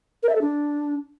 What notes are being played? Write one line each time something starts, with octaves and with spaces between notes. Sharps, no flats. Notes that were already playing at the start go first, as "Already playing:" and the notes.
A#4
E5
A4
D4